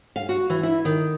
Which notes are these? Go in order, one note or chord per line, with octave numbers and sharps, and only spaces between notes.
F5
F#4
E3
E4
D#3